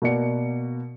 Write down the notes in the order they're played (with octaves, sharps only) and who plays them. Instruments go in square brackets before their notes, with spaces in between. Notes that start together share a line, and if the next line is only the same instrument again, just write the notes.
[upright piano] B2 A#3 F#4 D5 C#7